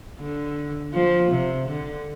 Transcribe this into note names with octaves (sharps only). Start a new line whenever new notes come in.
D3
F3
C3
D3